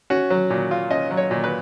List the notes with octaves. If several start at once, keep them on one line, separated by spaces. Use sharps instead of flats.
C#4 F#4
F#3
A#2
F4
C#4 D#5
F#3
C#5
A#2
B4